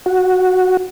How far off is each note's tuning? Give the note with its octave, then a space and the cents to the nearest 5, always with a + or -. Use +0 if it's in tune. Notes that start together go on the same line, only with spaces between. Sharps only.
F#4 -5